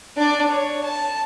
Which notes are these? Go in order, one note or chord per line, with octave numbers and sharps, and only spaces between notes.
D4 D5
C#5
A5